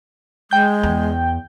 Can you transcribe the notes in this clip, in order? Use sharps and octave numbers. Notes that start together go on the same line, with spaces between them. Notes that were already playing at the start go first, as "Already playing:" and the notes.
G#3 G5 G6
E2